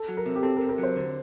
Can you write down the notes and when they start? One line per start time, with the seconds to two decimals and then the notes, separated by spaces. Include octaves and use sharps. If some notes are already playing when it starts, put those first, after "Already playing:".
Already playing: A4
0.08 F#3
0.17 A#4
0.26 C3
0.36 G4
0.43 C4 A4
0.57 A#4
0.61 C3
0.69 A#4
0.78 F#3
0.83 C5
0.96 D3